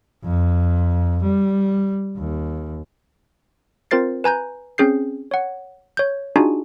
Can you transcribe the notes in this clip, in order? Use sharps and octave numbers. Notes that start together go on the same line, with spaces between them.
F2
G3
D#2
C4 F4 A#4 C5 A6 C7
B4 G#5 A#5 G6
C4 C#4 G#4 G6 C7
C#5 F#5
C#5 G6
D4 D#4 F4 F#4 G#4 G#5